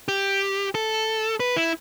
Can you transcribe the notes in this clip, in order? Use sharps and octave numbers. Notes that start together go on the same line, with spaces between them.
G4
A4
B4
E4